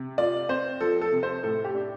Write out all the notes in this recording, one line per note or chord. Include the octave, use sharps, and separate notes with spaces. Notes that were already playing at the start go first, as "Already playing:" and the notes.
Already playing: C3
F4 D5
C4 C5
F3 A4
A4
C3
C5
A2 A4
G4
D4